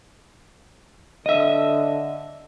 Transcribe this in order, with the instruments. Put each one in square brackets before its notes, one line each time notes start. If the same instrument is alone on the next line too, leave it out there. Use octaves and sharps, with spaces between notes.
[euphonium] D3 [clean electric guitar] D#5 E5